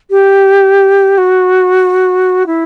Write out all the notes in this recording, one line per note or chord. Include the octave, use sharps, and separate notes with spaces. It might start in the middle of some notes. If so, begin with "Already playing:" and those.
G4
F#4
E4